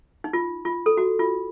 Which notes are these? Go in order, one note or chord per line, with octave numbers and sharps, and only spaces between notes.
D#4
F4
F4
A4
F#4
F4